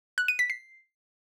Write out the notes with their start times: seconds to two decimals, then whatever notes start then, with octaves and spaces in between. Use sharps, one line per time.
0.18 F#6
0.28 D#7
0.39 B6
0.50 C7